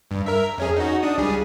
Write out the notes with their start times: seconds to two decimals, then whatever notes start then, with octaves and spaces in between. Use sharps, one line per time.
0.11 G2
0.26 A#4 E5
0.58 F2 C#4 G#4
0.76 D#4 F#4
1.03 D4 D#6
1.18 C#2 G3 G#4